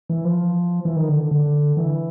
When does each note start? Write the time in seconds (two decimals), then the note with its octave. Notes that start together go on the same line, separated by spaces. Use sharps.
0.10 E3
0.25 F3
0.85 E3
0.96 D#3
1.09 D3
1.31 D3
1.77 E3